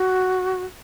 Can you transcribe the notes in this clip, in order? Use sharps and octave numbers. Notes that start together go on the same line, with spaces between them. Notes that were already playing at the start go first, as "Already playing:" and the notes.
Already playing: F#4